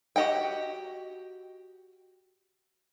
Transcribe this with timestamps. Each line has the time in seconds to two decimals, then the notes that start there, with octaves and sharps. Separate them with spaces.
0.16 F#4 G4 D#5 F#5 G5